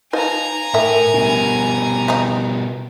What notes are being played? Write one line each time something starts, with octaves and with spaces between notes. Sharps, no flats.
D#4 B4 C5 D#5 F5 G#5 A#5
A2 E3 A4 A#4 E5
B2 G3 D4
E3 C4 D#4